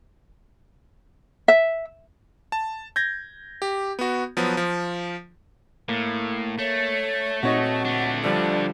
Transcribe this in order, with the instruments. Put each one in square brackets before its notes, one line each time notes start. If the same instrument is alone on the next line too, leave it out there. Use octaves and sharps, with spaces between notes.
[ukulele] E5
[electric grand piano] A5
G6 G#6 A#6
G4
B3 F#4
F3 F#3 B3
F3
[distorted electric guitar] A2 [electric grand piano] A#3
[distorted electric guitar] A3 [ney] C#5
[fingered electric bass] A#2 C4 [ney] D#4 [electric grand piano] F#4 C#5 D#5
[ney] F#5
[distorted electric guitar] A3 D4
[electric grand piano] D3 F3 G3 [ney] D5